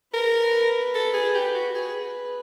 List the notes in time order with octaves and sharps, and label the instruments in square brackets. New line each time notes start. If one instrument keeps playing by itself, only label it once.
[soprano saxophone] A#4 [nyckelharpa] B4
[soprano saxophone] A4
G#4
G4
F#4
[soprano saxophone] G#4 [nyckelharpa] B4